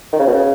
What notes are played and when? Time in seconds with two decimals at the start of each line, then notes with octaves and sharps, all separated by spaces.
0.13 D#3
0.19 C#3
0.27 B2
0.34 C#3